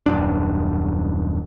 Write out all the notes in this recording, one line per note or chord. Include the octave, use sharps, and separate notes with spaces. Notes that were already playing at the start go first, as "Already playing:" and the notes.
D#1 F#2 D4